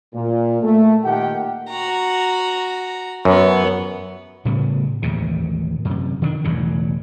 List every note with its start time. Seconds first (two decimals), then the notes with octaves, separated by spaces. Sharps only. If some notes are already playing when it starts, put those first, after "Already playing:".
0.14 A#2
0.62 A3
1.04 A#2 D#3 G4 F#5 G5
1.70 F#4 A#5
3.25 F#2 B3 C#5
4.45 A2 C#3 G3 B3
5.02 A1 D#2 G#2 C3
5.85 F#2 C3
6.22 D#3 C4 D4
6.44 E1 A1 E2 C#3